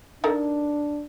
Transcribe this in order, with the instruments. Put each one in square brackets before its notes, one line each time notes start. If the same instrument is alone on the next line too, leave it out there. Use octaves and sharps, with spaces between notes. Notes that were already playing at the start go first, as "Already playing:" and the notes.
[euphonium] D4 [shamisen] D#4 A4 A#4